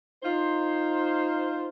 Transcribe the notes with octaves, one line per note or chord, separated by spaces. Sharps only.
D#4 F4 C5